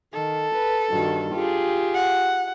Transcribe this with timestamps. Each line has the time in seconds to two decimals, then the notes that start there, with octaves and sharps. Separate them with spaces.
0.14 D#3 A4
0.55 B4
0.90 G2 D#3 F#4
1.34 F4 G4 G#4
1.94 F#5